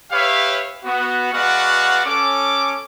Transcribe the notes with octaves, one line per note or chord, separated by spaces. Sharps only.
G4 B4 C#5 E5 F5
B3 F#4
G#3 F#4 B4 D5 F5 F#5
C#4 A4 D6